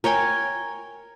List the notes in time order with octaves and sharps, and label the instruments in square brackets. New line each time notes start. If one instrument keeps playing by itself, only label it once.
[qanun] A#4 C#5 G5 G#5